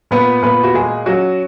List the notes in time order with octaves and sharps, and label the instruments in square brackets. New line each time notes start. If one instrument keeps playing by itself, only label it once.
[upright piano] A#2 B3 B4
A#2 B3 B4
F#4
G#3 G#4
F#3 C#4 F#4